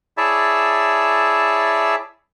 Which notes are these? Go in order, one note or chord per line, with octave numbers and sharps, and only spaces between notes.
E4 G#4 C#5 D5 E5 A5